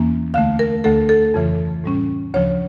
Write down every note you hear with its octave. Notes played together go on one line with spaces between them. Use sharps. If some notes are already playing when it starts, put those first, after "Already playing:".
Already playing: E2 E3 A#3 C#4
D2 D3 A3 F5
A#4
D2 D3 A3 A4
A4
F2 C#3 E3
A2 G3 C#4
D2 C#3 F3 C#5